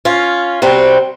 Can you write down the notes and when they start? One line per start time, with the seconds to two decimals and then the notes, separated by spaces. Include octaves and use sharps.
0.05 C#4 F4
0.62 C3 G3 C4 F#4